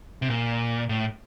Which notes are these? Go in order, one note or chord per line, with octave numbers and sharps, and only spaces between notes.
C3
A#2
A2